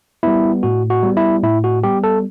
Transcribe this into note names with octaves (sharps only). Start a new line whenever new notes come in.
G3 B3 E4
A2 F#4
F#4
G3 B3
E4
A2 E4
F#4
G3 B3 G4
A4